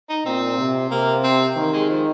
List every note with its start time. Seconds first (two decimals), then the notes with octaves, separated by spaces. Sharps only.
0.09 D#4
0.25 A#2 C4
0.59 C3
0.91 C3 A#3
1.24 C4
1.57 D#3 A#3
1.73 G#3
1.89 F3